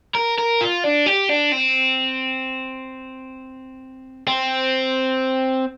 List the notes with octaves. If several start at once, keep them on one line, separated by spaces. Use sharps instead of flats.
A#4
A#4
F4
D4
G4
D4
C4
C4